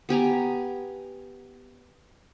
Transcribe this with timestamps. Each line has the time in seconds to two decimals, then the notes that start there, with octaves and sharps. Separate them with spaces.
0.09 B3 G4 G#5 A#5